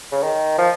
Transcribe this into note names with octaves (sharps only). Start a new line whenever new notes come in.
C#3
D#3
F3